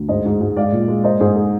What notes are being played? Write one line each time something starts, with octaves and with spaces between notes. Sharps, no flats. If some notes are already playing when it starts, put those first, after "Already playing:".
Already playing: D2
G#2 C5 D#5
G#2
G#2
G#3 D5 F5
A#2
G#3
A#3 C5 D#5
G#2 G#4 C5
G#4